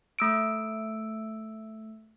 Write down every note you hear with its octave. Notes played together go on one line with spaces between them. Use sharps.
A3 E6 D7